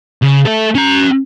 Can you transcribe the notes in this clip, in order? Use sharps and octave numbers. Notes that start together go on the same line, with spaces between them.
C#3
A3 A4
C#4 A#5